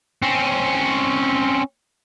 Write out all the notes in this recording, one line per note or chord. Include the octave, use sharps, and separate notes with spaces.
C4 C#4